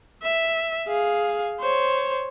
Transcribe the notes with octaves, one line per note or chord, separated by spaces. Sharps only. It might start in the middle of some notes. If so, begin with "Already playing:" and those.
E5
G#4 F5
C5 C#5